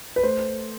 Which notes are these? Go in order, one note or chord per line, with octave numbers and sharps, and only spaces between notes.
B4
A3 C5